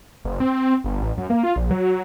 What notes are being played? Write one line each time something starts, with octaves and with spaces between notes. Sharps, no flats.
F#1
C4
C4
G1
A1
F#2
A#3
F4
A#1
F#3